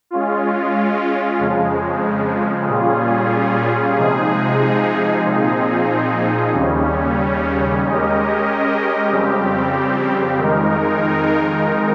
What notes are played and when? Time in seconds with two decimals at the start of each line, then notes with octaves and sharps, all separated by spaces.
0.11 G#3 C#4 F4
1.39 F2 C#3 F3 G#3
2.68 A#2 G3 C#4 F4 G#4
3.96 C3 F3 G#3 D#4 G#4
5.24 A#2 F3 C4 D#4 G#4
6.52 D#2 C#3 G3 C#4
7.81 G#3 C#4 G4 A#4 D#5
9.10 F2 C#3 G3 C4 G4
10.38 F2 D#3 G#3 D#4 A#4